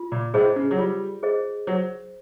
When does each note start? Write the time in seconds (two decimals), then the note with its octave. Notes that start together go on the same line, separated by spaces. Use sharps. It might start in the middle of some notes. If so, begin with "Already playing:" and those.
Already playing: F4
0.12 A#2
0.34 A2 G#4 C5 D#5
0.56 C#3
0.71 F#3
0.78 G3 F4
1.23 G#4 C5 D#5
1.67 F#3 C5